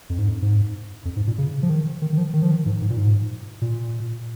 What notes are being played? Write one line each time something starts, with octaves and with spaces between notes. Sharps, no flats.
F2
G#2
F2
G#2
F2
G#2
A#2
C#3
F3
D#3
D#3
D#3
F3
D#3
F3
D#3
G#2
G#2
A#2
G#2
A#2